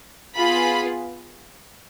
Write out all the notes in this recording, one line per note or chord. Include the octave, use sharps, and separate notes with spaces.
B3 F4 G#4 B5